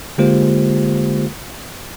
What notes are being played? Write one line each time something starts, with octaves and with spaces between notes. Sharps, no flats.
D3 G#3 A#3 F4 G4 C5